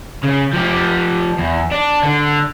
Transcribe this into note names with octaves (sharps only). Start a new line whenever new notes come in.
C#3
F3 G4
E2
D4
D3